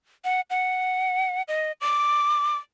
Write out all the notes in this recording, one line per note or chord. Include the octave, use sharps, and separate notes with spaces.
F#5
F#5
D#5
D6